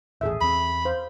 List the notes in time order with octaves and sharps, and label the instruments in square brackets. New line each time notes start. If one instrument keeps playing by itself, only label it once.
[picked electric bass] D#1 A1 [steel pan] G#4 A4 E5
[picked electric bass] E2 C4 [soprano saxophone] B5
[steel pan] C5 F5